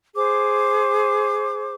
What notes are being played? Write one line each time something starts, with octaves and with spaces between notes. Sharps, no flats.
G#4 C5 D6